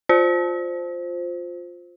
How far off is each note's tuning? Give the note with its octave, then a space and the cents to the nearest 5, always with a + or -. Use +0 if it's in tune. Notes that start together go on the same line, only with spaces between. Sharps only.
F4 +15 C5 +0